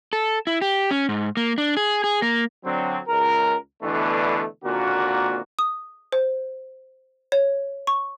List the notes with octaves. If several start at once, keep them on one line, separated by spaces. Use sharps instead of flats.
A4
E4
G4
C#4
G#2
A#3
D4
G#4
G#4
A#3
D3 F#3 C4
C#2 A#4
B2 D3 E3 A3 B3 D4
G#1 A#2 D3 A#3 F#4
D#6
C5
C#5
C#6